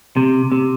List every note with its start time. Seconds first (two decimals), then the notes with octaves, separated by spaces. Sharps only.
0.17 C3
0.52 C3